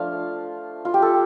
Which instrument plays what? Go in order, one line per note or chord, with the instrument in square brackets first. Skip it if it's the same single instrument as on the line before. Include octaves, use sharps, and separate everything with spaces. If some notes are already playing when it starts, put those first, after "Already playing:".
Already playing: [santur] F3 A3 D4 F4 F5
F4
G4
A4